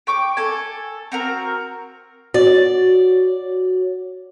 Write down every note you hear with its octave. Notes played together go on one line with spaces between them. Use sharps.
G5 C#6 D6
A4 G#5
C4 F#4 A#4
F#4 C#5 D5